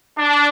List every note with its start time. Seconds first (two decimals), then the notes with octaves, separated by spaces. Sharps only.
0.18 D4